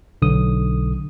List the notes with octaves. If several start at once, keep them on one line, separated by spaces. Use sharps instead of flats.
B1 D3 D#6